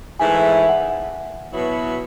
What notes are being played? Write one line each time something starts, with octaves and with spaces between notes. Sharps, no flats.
G#2 E3 A3 E4 G#5
E5
E5
F#5
B2 F#3 B3 E4